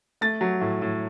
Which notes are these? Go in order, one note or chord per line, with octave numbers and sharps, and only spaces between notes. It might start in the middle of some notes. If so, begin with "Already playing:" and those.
A3 A6
F#3
A2
A2